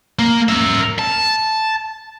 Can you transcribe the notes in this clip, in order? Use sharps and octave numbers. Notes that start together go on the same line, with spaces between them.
A#3
A#4 E5
A5